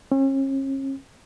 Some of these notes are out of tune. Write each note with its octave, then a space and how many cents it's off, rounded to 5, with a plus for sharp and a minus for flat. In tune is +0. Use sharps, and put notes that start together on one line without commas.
C#4 -40